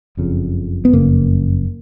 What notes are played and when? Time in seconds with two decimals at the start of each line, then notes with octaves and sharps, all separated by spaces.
0.17 F#1 F2 C#3
0.85 B3
0.93 F#1 F2 C#3 A#3